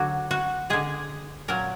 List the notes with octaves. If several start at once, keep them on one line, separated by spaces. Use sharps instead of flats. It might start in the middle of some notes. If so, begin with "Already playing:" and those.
Already playing: D3 F#3 F#4
F#4
D3 G#3 G#4
A#2 F#3 A#4